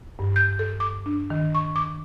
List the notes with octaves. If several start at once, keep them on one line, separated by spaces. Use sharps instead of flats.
G2
G6
A4
D6
D4
D#3
C#6
D6